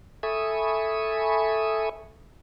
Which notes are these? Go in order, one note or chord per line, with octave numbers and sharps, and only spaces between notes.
A4 E5 G#5 B5 C#6 D#6